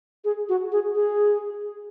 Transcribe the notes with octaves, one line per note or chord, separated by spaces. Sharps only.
G#4
F#4
G#4
G#4